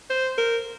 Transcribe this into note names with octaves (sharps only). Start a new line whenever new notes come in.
C5
A#4